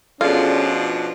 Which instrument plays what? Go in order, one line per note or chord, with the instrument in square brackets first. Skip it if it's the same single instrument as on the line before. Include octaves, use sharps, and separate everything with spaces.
[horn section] B2 F3 D4 [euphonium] C#4 [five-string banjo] F4 [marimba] G#4 A4 D5